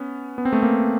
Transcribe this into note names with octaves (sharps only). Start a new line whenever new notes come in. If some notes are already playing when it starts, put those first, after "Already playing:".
Already playing: B3 C#4
B3
C4
A3 B3
A#3